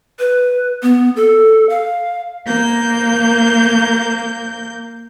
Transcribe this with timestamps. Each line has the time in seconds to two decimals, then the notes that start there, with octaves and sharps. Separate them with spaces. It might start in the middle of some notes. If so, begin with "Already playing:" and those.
0.19 B4
0.83 B3
1.16 A4
1.69 F5
2.44 A#3 G6